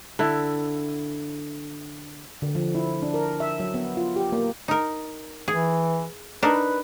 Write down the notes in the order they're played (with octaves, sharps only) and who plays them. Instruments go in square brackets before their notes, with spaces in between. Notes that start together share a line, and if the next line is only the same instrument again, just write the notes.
[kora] D3 E4
[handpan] D3
F3
E4
D4
A#4
E5
F#3
B3
F4
G4
A#3
[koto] D#4 A#4
[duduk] E3 [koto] G#4
[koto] D4 D#4 A#4 [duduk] B4